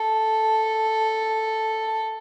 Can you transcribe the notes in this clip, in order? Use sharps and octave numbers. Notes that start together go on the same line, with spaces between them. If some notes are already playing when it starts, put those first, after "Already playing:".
Already playing: A4